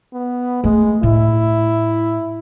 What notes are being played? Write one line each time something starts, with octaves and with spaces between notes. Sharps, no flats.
B3
G#3 A3
A2 E4